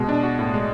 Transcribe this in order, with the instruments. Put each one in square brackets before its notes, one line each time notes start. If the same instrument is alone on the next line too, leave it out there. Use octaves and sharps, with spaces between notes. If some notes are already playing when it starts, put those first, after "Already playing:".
Already playing: [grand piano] B2 [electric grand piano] G#3 B3
[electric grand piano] D4
F#4
A2
G#3